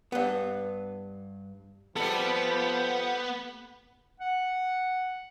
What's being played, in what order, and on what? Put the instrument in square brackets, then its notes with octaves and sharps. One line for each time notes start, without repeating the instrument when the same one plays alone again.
[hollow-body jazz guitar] G2 B3
[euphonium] F3 [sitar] G3 A4 [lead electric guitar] B3
[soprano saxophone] F#5